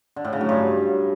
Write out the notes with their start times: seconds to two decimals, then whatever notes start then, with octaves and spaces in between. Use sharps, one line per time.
0.16 D3
0.25 A2
0.33 C#3
0.41 F#3
0.49 G2